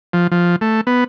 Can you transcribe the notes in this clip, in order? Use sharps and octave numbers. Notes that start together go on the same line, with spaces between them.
F3
F3
A3
B3